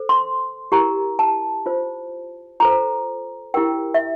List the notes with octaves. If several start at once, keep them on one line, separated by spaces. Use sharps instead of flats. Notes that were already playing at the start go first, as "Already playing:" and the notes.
Already playing: A4 C5
C6
E4 G4 A#4 A#5
A5
F4 C5
F4 A4 C5 A#5
E4 G4 A#4 G5
E5